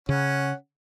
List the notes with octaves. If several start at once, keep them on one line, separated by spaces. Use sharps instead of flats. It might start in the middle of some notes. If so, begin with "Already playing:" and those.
C#3 C#4 F#5